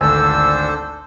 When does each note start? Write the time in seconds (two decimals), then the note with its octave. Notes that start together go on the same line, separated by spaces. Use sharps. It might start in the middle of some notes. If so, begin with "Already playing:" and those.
0.01 G#1 D2 D4 A4 C5 G#5 E6